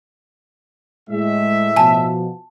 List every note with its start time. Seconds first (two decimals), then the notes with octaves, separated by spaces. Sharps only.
1.09 A2 G#3 E5
1.76 B2 F3 G#5 A5